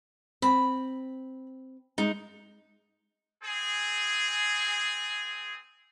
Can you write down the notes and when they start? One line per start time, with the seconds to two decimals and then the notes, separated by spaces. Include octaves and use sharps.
0.42 C4 B5
1.98 G#3 D#4
3.43 C4 G#4